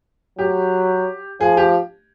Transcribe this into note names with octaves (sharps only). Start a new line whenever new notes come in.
F#3 G4
F3 G#4
G4